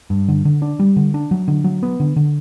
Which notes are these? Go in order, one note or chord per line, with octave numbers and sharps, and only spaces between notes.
G2
D3
D3
D4
G3
D3
D4
F#3
D3
F#3
B3
D3
D3